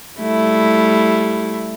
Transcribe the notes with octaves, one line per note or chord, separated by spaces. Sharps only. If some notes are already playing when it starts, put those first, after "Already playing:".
G3 A3 E4